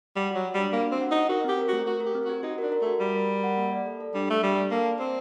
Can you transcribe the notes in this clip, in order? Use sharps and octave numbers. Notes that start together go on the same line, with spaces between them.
G3 F#5
F#3 F#4
F#4
G3 D4
A#3 D4
F#4
C4
F#5
D#4 F#5
F#4 A#4
C4 G4
A#4
A3 F#4
F#4 A#4
A#4
G4
C4
F#4 G4
D#4 F#4
D4 A#4
A#4
A3 F#4
G3 A#4
A#4
A#4
F#5
A#3
D5
A4
A4
G3 D4
A3 D4
G3 D4
A4
A#3 A5
D5
C4 G4